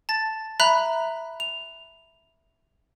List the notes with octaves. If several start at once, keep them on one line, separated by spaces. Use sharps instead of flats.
A5 A6
E5 A#5 B5 F#6
F7